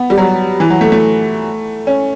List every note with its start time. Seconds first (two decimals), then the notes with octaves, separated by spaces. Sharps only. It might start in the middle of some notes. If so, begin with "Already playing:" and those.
Already playing: B3
0.10 G3
0.18 F#3
0.60 E3
0.70 F#3
0.81 A3
0.92 A3
1.87 C#4